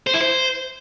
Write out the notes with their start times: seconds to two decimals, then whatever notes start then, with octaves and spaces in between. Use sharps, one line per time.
0.07 C5
0.14 E4
0.21 C5